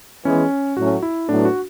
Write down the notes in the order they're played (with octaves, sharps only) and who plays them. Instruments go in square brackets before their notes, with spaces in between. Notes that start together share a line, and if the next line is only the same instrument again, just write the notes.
[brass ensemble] E3 G#3 B3 [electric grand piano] C#4
[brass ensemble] A2 F#3 A3 C#4 [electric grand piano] F#4
[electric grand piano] E4
[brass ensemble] A2 F#3 B3 [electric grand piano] D4
[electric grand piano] F#4